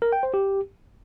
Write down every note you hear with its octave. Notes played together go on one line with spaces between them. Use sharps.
A#4
G5
C5
G4